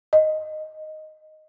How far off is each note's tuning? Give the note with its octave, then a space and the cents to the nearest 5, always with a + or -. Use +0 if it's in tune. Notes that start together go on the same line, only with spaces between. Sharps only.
D#5 +0